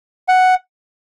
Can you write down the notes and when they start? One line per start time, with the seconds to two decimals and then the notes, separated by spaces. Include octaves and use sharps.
0.28 F#5